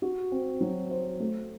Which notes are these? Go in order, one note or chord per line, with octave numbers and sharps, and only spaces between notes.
F#4
C4
F#3
C5
A3